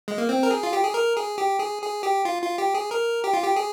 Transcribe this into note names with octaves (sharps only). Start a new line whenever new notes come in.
G#3
A#3
C4
A#4
G#4
F4
G4
G#4
A#4
G#4
G4
G#4
G#4
G4
F4
F4
G4
G#4
A#4
G4
F4
G4
G#4